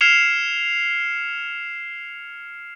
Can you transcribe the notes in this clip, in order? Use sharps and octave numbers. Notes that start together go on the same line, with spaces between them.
F6 G#6 C7 C#7 E7 F7